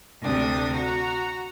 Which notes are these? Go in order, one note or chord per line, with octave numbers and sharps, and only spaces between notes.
D2 C3 D4 D#6 A#6
F#4 A#5